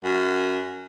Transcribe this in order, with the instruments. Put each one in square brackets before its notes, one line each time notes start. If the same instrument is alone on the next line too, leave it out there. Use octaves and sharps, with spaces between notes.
[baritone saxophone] F#2